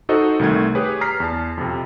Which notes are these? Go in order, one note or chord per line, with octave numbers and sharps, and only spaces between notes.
D#4 F#4 A4 C5 D#5
C2 D#3 A3 G#6
G4 G#4 B4 C#5
A#5 F6 B6 C7
E2 A5
F2 C3